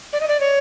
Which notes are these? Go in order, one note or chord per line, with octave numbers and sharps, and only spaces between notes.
D5
D#5
D5
C#5